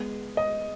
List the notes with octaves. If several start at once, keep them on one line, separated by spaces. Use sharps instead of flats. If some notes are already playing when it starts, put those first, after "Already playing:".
Already playing: G#3 B3 G#4 B4
D#5